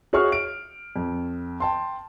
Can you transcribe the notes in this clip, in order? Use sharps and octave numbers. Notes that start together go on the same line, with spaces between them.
F#4 G#4 C#5 E5 C#6 F6
D7
F2
G5 A5 C6